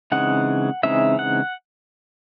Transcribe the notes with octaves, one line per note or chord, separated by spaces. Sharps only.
C#3 E3 G#3 C4 D#4 F#5
C#3 E3 G#3 C4 D#4 E5
F#5